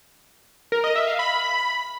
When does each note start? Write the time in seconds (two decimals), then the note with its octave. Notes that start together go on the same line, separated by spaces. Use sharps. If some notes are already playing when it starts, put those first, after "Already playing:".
0.72 A#4
0.84 D#5
0.96 E5
1.07 F5
1.19 B5